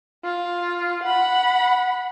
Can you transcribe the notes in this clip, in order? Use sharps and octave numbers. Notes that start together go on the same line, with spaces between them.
F4
F#5 B5